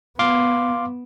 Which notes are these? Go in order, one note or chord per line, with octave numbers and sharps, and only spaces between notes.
B3 F5 C6 D6